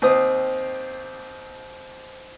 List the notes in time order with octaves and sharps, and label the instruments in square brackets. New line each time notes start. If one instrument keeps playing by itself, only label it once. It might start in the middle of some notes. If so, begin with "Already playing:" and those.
[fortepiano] D#2 C4 D#6